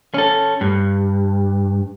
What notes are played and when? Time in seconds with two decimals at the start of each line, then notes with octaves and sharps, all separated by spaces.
0.14 C#4 A4
0.61 G2